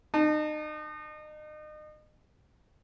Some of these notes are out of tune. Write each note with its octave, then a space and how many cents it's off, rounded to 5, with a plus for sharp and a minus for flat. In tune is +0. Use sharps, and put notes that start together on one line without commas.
D#4 -35 A5 +0